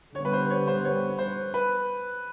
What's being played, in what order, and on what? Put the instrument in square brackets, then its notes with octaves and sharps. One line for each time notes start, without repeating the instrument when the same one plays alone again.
[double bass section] D3 G3 B3 [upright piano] C#5
[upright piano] B4
C5
C#5
C5
C#5
C5
B4